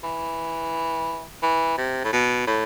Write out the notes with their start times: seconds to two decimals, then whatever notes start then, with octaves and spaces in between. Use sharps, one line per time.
0.03 E3
1.42 E3
1.78 C3
2.04 A2
2.13 B2
2.47 A2